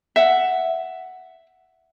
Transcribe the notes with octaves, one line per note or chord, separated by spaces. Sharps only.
E5 F#5